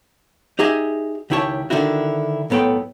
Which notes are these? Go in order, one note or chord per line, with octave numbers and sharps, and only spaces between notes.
D#4 G4 G#4 D#5 E5
C#2 D#3 E4 G4 C#5 A5
D3 D#3 D4 E4 F#4
B1 A2 B3 A4 G5 C6